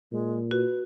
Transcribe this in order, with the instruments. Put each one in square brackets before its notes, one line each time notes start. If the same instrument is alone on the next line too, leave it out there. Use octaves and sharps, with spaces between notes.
[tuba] A#2 [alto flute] G#3
[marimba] F#4 [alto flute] B4